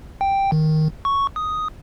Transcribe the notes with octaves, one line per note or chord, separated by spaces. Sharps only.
G5
D#3
C#6
D#6